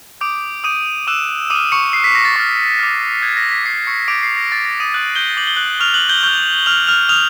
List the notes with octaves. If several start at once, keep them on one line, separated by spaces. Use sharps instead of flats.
D6 D#6 G6 D7
D6 D#6 G6 D#7
D6 E6 F#6 E7
D6 D#6 F6 D#7
C#6 C#7
D#6 F#6 C7
B6
A#6
A6
C#6 F6 A6
D6 F6
D#6 F#6 G#6
A#6
B6
D6 F#6 C7
C#6 C#7
D6 D#6 G6 D7
C7
A#6
C#6 F6 A6
A#6
D#6 D#7
D6 F#6 F#7
G6 G7
D6 G6 F#7
G7
F#6 F#7
C#6 F6 F7
F#6 F#7
G6 G7
C#6 F6 G6 G7
C#6 F6 F7
F6 F7
D#6 F6 F#6 F7